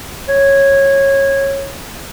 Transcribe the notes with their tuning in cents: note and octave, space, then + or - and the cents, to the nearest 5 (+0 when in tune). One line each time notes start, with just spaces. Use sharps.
C#5 -15